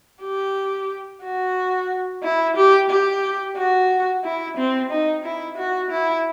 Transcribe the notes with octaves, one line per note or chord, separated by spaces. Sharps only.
G4
F#4
E4
G4
G4
F#4
E4
C4
D#4
E4
F#4
E4